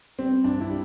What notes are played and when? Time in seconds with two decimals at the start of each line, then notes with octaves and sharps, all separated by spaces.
0.19 G3 C4
0.44 G2 D4
0.60 E4
0.70 G3